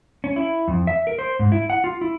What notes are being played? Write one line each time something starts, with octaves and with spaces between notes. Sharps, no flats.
C#4
E4
F2
E5
A#4
C5
G#2
E4
F#5
F4
E4